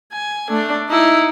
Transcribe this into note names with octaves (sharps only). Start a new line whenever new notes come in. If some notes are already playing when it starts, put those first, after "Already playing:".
G#5
A3 D4
D#4 E4